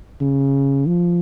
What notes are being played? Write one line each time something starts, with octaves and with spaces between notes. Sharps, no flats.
C#3
F3